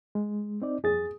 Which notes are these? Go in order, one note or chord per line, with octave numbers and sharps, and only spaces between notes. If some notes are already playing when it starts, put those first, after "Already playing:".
G#3
C4 D#4 D5
F2 G#4 A6